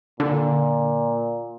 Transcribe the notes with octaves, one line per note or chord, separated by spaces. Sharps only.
A#2 D3